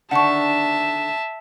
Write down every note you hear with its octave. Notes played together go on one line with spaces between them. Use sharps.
D3 D#3 D4 E5 F#5 A5 C#6